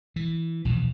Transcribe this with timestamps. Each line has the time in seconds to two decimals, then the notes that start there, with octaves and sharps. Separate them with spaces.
0.16 E3
0.65 A#1 E2 B2 E3